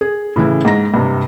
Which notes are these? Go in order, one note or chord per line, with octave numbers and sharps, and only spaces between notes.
G#4
A2 C#3 E3 E4
G#2 A#5 A#6
G2 C3